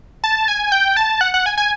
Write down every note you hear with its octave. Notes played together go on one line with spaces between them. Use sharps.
A5
G#5
G5
A5
F#5
F#5
G#5
G#5